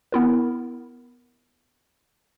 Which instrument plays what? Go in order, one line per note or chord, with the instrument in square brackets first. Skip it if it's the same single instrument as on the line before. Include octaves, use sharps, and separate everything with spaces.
[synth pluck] B3 E4 A#4